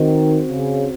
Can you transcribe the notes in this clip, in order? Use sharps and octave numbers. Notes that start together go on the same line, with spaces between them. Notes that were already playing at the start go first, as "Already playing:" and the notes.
Already playing: D#3 C4 F#4 C5
C#3